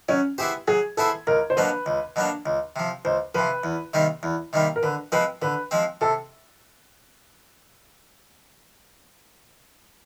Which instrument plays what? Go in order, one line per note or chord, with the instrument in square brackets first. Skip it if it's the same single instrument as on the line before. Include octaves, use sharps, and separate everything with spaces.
[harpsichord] F#3 [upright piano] C#4
[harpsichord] B3 E4 G#4 C5 [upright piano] G4
[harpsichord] F#3 [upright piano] G#4
[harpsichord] B3 E4 G#4 C5 [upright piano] A4
[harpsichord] C#2 [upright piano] A#4
[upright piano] C5
[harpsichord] B2 F#3 A#3 D4 [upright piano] B4
[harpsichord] C#2
B2 F#3 A#3 D4
C#2
C3 F3
[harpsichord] C#2 [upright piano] C5
[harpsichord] C3 F3 [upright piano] B4
[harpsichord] E2
C3 D#3 G3 A#3
E2
C3 D#3 G3 A#3
[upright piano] A#4
[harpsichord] D3 [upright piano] B4
[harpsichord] F3 G#3 C4 [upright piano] B4
[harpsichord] D3 [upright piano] B4
[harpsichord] F3 G#3 C4
[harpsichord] C3 [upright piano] A4